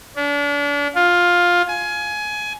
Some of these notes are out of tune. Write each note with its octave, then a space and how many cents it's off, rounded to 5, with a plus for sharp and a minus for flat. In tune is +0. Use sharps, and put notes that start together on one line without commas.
D4 -35
F4 +10
G#5 +20